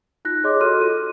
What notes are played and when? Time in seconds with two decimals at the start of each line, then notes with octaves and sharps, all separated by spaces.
0.25 D#4 F4 F#6 A#6
0.44 G#4 C#5 D#5 C6 D6
0.60 F#4 A4 C6 F6 F#6 D#7
0.80 F4 D#7